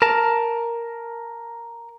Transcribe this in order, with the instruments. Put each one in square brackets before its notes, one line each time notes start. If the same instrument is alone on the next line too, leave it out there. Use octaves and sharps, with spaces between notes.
[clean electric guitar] A#4 A5